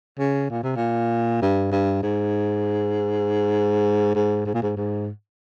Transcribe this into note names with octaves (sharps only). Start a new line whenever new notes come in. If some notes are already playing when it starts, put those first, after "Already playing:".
C#3
A#2
C3
A#2
G2
G2
G#2
G#2
G#2
A#2
G#2
G#2